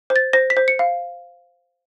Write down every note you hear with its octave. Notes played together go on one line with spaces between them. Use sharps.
C5
A6
C5 A#6
B6
C5
C#7
F5